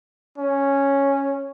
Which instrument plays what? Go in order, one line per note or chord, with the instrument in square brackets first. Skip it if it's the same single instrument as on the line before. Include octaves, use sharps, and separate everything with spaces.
[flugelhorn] C#4